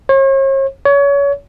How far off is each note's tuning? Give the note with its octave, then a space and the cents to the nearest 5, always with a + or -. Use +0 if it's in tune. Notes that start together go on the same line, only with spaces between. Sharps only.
C#5 -40
C#5 +30